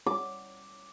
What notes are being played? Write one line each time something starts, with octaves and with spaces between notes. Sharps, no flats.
D6